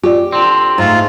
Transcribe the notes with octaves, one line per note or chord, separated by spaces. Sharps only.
F4 G4 D5
D3 C4
G#2 A3 F4